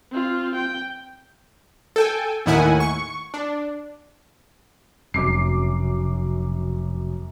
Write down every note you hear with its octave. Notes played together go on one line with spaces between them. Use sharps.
C4 F4
G5
A4 G5 G#5
D#2 A2 D#3 E4 F#5 G#5
C#6
D4
F1 F#2 D6 C7